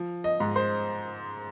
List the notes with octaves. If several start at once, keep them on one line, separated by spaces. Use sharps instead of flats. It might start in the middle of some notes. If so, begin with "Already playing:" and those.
Already playing: F3
D#5
G#2
C5